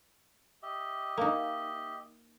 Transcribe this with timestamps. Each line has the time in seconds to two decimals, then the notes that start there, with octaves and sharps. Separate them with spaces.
0.62 G4 D#5 E5
1.18 A#3 D#4